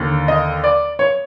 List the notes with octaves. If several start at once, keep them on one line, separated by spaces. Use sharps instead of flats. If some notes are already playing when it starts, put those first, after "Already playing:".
Already playing: D#2 D3
D#5
D5
C#5